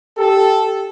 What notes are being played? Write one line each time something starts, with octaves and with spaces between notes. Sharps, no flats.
G4 A4